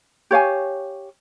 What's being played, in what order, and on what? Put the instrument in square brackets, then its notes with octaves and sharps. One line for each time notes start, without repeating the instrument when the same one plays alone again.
[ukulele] G4 C#5 F5 G#5